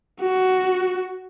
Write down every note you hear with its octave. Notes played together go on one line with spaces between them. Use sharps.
F#4